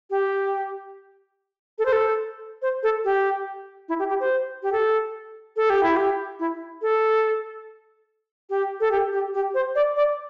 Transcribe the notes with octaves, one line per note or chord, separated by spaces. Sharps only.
G4
A4
C5
A4
C5
A4
G4
E4
G4
G4
C5
G4
A4
A4
G4
E4
G4
E4
A4
G4
A4
G4
G4
G4
C5
D5
D5